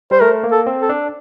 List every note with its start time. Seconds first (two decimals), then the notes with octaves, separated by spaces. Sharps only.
0.11 G3 C5
0.21 A3 A#4
0.44 A#3
0.52 A4
0.66 C4
0.82 A4
0.89 D4